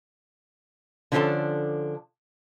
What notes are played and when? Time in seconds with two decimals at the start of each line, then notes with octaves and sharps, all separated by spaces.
1.12 D3 F3 C#4 D4 A4 A5